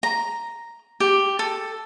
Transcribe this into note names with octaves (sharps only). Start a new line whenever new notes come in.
A#5
G4
A4